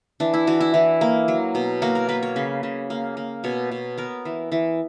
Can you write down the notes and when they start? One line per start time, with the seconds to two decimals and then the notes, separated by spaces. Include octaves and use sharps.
0.20 E3 D4
0.34 E4
0.47 E3 F#4
0.61 E4
0.74 E3
1.01 A#3
1.28 F#3
1.55 B2
1.82 A#3 F#4
1.95 A#4
2.09 A#3 B4
2.23 C#5
2.36 C#3 B4
2.63 C#3
2.90 A#3
3.17 A#3
3.44 B2 C#5
3.72 B2
3.98 B3 A#4
4.25 E3
4.52 E3